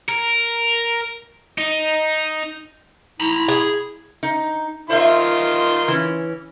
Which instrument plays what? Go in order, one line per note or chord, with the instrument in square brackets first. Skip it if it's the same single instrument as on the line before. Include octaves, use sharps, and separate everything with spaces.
[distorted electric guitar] A#4
D#4
[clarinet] E4 [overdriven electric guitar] A#5 B5
[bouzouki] G#4
[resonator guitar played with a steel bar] D#4
[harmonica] D#3 F4 C6 [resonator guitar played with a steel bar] C5 E5
[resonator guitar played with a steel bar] E3 C#4